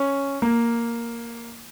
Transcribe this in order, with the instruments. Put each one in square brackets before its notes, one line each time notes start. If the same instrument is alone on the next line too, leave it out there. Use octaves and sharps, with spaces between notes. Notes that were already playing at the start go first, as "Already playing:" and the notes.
Already playing: [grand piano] C#4
A#3